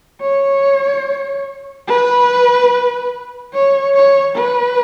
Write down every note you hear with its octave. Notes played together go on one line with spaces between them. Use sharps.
C#5
B4
C#5
C#5
B4